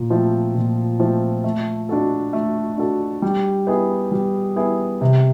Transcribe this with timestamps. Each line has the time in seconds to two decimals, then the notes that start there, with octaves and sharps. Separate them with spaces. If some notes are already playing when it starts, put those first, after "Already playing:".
Already playing: A#2
0.10 F3 A3 C4
0.55 A#2
1.00 F3 A3 C4
1.44 A3
1.89 D4 F#4 A4
2.33 A3
2.77 D4 F#4 A4
3.22 G3
3.67 B3 E4 G#4
4.12 G3
4.56 B3 E4 G#4
5.01 C3